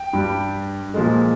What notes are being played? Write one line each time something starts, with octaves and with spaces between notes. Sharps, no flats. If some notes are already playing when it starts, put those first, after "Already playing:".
Already playing: G5
G2 G3
A#2 F3 G#3